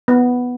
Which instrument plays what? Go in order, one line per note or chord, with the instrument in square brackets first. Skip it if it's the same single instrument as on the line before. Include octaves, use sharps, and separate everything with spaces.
[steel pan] B3